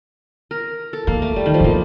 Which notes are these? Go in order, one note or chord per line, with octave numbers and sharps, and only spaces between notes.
A#4
A4
D#3 A#3
A3
G3
D#3
F3
D3
D#3 A#3